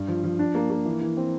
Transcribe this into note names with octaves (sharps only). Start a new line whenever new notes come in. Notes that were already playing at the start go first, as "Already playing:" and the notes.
Already playing: G2
F3
F3
D4
A#3
A#3
E3
E3
C4